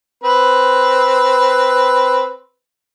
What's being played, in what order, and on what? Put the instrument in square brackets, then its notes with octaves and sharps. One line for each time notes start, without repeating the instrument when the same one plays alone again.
[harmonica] C4 B4